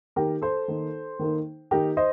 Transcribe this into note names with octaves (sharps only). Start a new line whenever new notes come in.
D#3 A#3 D#4 G4 A#4
A4 C5
D#3 A#3 D#4
D#3 A#3 D#4
D#3 A#3 D#4 G4 A#4
C5 D#5